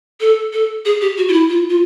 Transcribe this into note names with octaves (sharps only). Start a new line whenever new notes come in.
A4
A4
G#4
G4
F#4
F4
E4
F4
F4